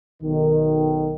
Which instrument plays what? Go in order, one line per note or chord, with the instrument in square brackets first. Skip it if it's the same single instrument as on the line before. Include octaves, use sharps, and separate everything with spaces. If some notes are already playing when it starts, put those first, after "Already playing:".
[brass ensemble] B1 D#3